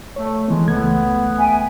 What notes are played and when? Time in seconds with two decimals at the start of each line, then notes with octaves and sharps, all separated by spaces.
0.16 A3 C#5
0.48 E3 G#3 B3
0.67 C#2 A3 B3 G#6
1.38 E5 G5 G#5